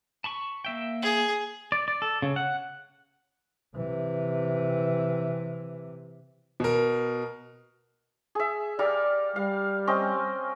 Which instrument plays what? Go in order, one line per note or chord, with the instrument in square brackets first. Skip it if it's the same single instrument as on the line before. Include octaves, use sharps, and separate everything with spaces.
[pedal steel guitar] A5 B5 C#6
A#3 E5 G5
[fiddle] G#4
[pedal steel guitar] D5
D5
A4
C#3
F#5
[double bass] C3 E3
[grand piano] B2 A#4
[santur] G#4 E5
[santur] G3 A#4 F5 [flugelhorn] D5
[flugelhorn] G3 [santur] F5
[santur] C4 C#4 D#5